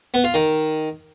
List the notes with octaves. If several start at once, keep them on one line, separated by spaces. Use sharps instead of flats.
B3
F4
D#3